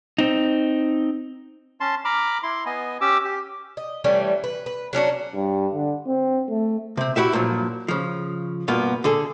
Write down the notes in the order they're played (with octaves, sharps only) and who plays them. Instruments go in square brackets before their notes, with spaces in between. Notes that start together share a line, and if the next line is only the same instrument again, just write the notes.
[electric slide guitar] C4 D#4
[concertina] C#4 A5 C6
A#5 B5 D6 F6
E4 C6
B3 D#5 G#5
C#4 G4 D6 E6
G4
[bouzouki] D#5
E3 G3 A3 C#4
B4
B4
F#3 C#4 D4 F#4
[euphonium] G2
D3
C4
A3
[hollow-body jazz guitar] C3 C4
E4 F#4 G4 E5
G2 A#2 F3 F#3
C#3 F3
G2 B2 A#3 B3 F4
D3 G#4 A4